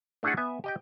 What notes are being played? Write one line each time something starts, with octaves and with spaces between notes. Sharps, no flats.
A3 D4 E4 G#4 A4 F#5
B3 E5 G#5
G4 D#5 G5